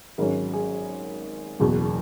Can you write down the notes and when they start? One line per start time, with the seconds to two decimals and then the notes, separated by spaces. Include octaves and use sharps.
0.18 G#1 G#2 F#3 C#4 A#4
0.54 G#4
1.60 F#1 E2 B2